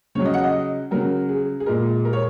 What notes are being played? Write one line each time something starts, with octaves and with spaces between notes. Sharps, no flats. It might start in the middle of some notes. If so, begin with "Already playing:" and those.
C#3 F#3 C#5
D#5
F#5
D#5
C#3 F#3 A#4
G#4
G#4
A#2 G#3 A#4
A#4
C#5